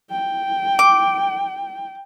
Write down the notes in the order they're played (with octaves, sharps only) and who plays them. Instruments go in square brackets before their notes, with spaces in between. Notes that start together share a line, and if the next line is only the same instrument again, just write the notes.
[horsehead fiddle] G5
[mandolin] D6